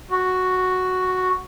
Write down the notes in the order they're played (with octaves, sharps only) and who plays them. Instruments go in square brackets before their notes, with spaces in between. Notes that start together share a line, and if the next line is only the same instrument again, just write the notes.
[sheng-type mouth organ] F#4